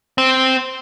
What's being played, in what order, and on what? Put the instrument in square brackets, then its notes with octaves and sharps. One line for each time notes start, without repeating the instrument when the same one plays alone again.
[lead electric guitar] C4